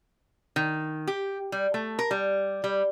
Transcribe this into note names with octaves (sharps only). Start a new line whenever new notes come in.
D#3
G4
G3
A3
A#4
G3
G3